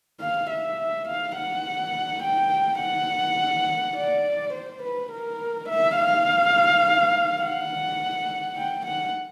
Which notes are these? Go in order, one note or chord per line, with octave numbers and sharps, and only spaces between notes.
F5
E5
F5
F#5
G5
F#5
D5
C5
B4
A#4
E5
F5
F#5
G5
F#5